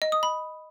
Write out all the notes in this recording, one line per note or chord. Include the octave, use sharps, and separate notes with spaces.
D#5
D#6
B5